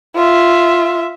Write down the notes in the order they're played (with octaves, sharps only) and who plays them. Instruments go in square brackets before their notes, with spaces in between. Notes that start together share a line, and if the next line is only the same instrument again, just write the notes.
[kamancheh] F4 E5